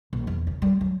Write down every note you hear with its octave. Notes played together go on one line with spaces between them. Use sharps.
A#1
E2
C#3
G3
F#3